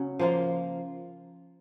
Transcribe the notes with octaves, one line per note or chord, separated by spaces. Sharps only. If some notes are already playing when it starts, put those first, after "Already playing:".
Already playing: C#3 F#3 C#4
F3 A#3 F4